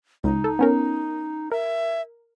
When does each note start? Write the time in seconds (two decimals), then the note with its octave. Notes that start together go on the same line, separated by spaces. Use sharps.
0.24 C#2 D#4
0.44 A4
0.59 B3 C#4 A#4
1.52 A#4 E5